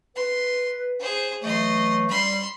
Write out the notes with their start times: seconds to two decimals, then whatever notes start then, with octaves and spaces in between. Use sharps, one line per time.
0.16 B4 C6
1.00 G#4 C5
1.43 E3 F#3 A3 D#5 C6
2.09 G3 B5 C6